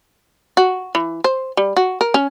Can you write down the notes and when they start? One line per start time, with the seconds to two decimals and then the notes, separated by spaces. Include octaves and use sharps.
0.57 F#4
0.95 E3
1.24 C5
1.57 G3
1.77 F#4
2.01 A#4
2.14 C#4